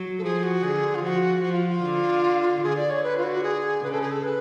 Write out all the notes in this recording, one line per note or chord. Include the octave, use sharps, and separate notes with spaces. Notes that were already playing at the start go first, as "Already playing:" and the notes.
Already playing: F#3
A4
F3 G#4
F#4
D3 G#4
F4
F3 F#4
F3 F#4
F4
F4
D3
D3 G#4
D5
C#5
B4
F4
F#4
G#4
C#3 B4
A4
G#4
A4
B4